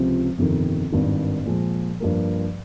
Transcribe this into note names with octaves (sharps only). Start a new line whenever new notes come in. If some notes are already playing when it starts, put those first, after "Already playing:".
Already playing: C#2 C3 F3 C4 F4
G1 F2 C3 D#3
G#1 G2 D#3
A#2 F3 G#3
G2 F3 A#3